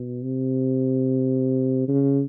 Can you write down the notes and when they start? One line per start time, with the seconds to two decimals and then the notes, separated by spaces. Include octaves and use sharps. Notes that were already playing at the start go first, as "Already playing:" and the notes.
Already playing: B2
0.24 C3
1.88 C#3